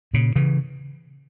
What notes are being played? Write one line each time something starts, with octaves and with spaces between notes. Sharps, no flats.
A#2 C#3
C#3 E3